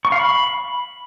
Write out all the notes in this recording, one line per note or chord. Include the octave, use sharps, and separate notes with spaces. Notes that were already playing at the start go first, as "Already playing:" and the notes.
C#6
F5
B5